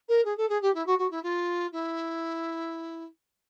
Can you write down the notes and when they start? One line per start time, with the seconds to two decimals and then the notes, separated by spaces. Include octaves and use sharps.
0.08 A#4
0.25 G#4
0.37 A4
0.49 G#4
0.62 G4
0.74 E4
0.86 F#4
0.98 F#4
1.10 E4
1.23 F4
1.72 E4